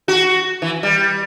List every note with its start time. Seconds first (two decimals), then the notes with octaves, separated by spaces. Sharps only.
0.08 F#4
0.62 E3
0.83 G3